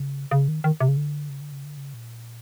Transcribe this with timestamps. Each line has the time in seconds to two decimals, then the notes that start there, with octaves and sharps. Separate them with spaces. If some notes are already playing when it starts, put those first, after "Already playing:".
Already playing: C#3
0.31 C#3
0.48 D#3
0.64 D#3
0.80 C3
0.88 C#3
0.97 D3
1.29 C#3
1.41 D3
1.52 C#3
1.65 D3
1.77 C#3
1.94 A#2